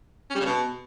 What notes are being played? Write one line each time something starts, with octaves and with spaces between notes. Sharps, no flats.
C#4
G3
C#3
B2